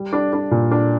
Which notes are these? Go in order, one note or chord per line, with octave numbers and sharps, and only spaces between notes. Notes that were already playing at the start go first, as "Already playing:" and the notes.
Already playing: G3
D4
D4
A#2
D4